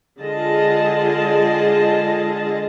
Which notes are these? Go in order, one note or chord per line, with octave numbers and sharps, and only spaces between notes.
D3 G#3 F4 G#4 D#5 A5